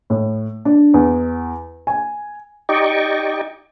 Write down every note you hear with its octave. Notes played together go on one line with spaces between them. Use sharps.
A2
D4
E2
G#5
D#4 G4 D5 D#5 G5 C#6